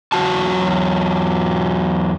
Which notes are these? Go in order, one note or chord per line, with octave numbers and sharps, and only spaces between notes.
E2 F#3 F#4 A5